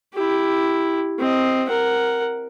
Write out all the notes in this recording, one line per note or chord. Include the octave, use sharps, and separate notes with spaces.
E4 G4
C4 D#5
A#4 F#5